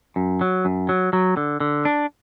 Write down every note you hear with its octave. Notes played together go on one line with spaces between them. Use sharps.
F#2
F#3
F#2
F#3
F#3
D3
D3
D4